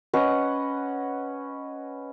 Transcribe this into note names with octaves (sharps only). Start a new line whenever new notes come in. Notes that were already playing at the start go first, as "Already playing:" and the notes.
C#4 B4 D#5 F#5